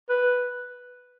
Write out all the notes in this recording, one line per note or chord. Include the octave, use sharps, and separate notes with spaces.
B4